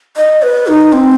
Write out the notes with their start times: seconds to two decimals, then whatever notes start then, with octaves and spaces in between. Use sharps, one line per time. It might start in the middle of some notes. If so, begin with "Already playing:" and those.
0.16 D#5
0.42 B4
0.67 D#4
0.92 C4